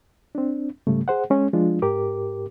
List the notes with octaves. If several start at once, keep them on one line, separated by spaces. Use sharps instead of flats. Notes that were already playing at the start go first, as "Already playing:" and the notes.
C4 D4
G#2 C#3 G3 A3
G#4 C5 F#5
G#3 C#4
F3 G#3 D4 F4
G#2 G4 A#4 D6